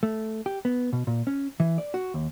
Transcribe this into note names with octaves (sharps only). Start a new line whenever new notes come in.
A3
G4
B3
B2
A#2
C#4
E3
D5
F#4
D#2